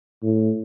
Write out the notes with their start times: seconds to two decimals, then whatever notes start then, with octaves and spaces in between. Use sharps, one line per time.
0.23 A2